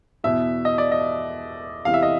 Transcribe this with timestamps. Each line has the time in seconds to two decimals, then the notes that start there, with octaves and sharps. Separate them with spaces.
0.24 E2 B2 E5
0.65 D#5
0.78 D5
0.92 D#5
1.85 E2 C3 E3 F5
1.94 E5
2.03 D#5